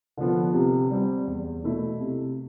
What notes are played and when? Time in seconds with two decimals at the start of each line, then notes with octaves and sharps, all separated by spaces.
0.17 D3 F3 B3
0.53 C3
0.90 G3 C4
1.27 E2
1.63 B2 A3 E4
2.00 C3